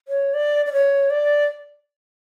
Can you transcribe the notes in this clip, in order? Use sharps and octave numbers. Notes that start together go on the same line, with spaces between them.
C#5
D5
D5
C#5
D5